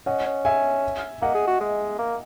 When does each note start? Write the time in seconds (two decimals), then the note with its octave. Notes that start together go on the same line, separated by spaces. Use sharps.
0.06 C#4 D#5 F#5
0.26 C#4
0.45 E5 G#5
1.22 A#3 D#5 F#5
1.35 G#4
1.47 F#4
1.61 G#3
1.99 A#3